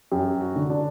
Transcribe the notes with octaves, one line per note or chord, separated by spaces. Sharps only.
F#2 G4
F#4
D3
D4